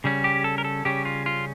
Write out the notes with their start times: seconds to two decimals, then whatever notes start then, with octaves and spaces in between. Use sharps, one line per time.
0.04 C#3 G3 C#4
0.24 G4
0.44 A4
0.58 A#4
0.64 A4
0.85 C#3 G3 C#4 G4
1.05 F4
1.26 F4